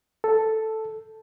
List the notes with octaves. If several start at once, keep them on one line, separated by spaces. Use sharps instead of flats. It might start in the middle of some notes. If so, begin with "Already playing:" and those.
A4